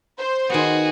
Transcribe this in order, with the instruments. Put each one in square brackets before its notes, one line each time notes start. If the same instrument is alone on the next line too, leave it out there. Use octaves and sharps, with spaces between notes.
[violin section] C5
[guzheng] D#3 B3 [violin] F#4 G#4